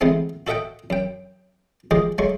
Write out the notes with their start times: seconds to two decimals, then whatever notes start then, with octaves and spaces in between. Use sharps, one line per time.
0.01 C3 E3 G#3 A3 B3 C4
0.47 F#4 A4 D#5 E5 F#5 G5
0.90 F#2 G5
1.91 F3 G#3 G4 G#4 D#5
2.18 F#3 G#3 A3 C#6